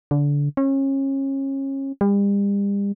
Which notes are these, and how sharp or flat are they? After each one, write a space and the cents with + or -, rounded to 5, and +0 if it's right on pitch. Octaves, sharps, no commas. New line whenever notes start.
D3 -25
C#4 -30
G3 +40